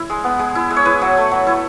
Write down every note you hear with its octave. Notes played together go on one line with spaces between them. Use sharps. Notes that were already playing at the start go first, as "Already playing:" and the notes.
Already playing: E4
G#3
B3
G#3
E4
G#3
C#5
E4 B4
F#3
A3
F#3
E4